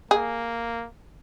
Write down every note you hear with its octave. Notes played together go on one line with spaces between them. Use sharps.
A#3 G#4